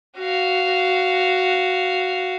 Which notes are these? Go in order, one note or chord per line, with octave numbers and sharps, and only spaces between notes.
F#4 F5